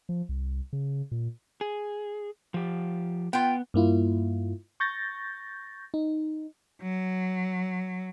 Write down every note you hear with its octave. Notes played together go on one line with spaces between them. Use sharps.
F3
C2
C#3
A#2
G#4
F3 G4
B3 F4 G5
G2 A#3 E4 F4
C#6 G6 A6 A#6
D#4
F#3